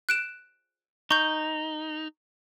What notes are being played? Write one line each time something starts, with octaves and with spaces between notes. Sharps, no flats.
F#6 D7 E7
D#4 C#6 G6